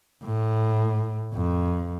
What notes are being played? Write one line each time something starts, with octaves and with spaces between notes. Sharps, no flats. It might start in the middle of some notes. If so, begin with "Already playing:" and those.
A2
F2